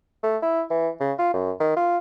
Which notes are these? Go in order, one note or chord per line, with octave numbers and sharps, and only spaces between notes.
A3
E4
E3
C#3
F4
F#2
D#3
F4